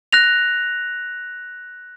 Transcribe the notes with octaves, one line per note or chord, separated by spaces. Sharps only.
F#6 A#6 F7